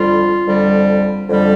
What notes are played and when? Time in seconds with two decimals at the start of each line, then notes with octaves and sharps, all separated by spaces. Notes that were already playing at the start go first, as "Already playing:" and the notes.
Already playing: F2 D3 G3 F4
0.47 F2 D3 G3
1.28 F2 D3 G3